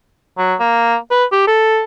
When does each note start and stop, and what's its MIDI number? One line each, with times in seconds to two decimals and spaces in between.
0.38 0.55 54
0.60 0.95 58
1.11 1.24 71
1.32 1.46 67
1.47 1.83 69